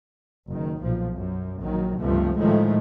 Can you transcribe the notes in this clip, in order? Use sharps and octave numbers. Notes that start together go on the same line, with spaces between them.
F#1 D#3
B1 A#2 F3
F#2
A#1 D#3 F#3
C#2 G2 C3 F3 A3
A2 D#3 F3 G#3 A3